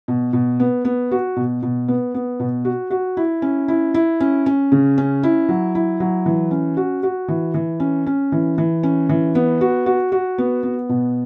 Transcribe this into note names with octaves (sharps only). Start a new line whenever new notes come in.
B2
B2
B3
B3
F#4
B2
B2
B3
B3
B2
F#4
F#4
E4
C#4
E4
E4
C#4
C#4
C#3
C#4
E4
F#3
E4
F#3
E3
C#4
F#4
F#4
E3
E3
C#4
C#4
E3
E3
C#4
E3
B3
F#4
F#4
F#4
B3
B3
B2